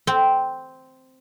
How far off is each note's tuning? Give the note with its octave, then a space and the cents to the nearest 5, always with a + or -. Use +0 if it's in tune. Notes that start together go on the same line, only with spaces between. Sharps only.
C4 -5